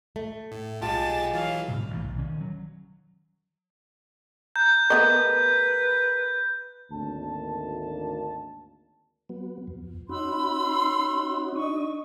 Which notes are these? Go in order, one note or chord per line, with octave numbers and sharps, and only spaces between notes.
A3
A2
B1 G#3 F4 G4 A5 A6
E3 F#3 F5
G#2 B2 D3 G3
A1 E3
B1
D#3 C#4
F#3
A#5 F#6 G6
A3 B3 G#4 A#4 B4 D#5 A#5
G#1 D2 A#3 A5
F#3 B3
F2
C#4 D#4 F#4 B5 C6 E6
D4 D#4 D#5 C#6